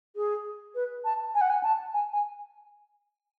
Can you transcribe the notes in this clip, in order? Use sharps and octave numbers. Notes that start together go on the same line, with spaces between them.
G#4
B4
A5
G#5
F#5
G#5
A5
G#5
G#5